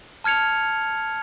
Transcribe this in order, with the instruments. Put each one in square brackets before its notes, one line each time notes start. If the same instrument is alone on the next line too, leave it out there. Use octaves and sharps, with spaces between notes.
[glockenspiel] A5 F6 G#6 C#7 F7